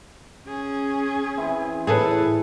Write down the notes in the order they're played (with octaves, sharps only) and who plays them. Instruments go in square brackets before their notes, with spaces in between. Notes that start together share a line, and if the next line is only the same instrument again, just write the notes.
[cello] C#4 G#4
[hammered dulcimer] E3 C4 E4
[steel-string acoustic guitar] A2 [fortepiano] G#4 A4 B4